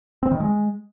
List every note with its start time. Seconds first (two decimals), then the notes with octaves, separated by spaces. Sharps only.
0.23 C4
0.31 D#3
0.40 G#3